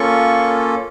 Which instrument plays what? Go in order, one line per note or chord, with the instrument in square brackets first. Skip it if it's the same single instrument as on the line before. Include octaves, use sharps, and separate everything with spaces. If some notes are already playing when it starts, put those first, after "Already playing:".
Already playing: [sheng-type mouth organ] A#3 C#4 F4 A4 C#6